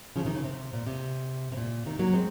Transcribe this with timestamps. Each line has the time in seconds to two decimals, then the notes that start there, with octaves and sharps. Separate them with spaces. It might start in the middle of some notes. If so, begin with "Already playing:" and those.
0.16 C#3 F3
0.25 C3 D#3
0.35 C#3
0.44 C3
0.73 A#2
0.86 C3
1.52 C3
1.57 A#2
1.86 C3 D#3
1.99 F#3 A#3
2.13 G#3 C4